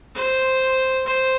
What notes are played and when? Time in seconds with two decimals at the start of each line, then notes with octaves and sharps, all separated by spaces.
0.15 C5
1.06 C5